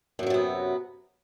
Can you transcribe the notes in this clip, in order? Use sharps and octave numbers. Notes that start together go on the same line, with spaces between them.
F#2 C3 F3 F#3 B3